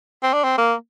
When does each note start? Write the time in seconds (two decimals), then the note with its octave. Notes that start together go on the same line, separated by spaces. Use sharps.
0.23 C4
0.33 D4
0.44 C4
0.58 A#3